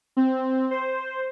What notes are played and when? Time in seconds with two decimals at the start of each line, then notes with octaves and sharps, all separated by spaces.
0.17 C4
0.71 C5